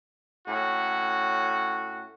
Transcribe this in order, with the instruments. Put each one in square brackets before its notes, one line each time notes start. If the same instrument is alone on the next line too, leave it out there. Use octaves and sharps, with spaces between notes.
[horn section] A2 C#4 F#4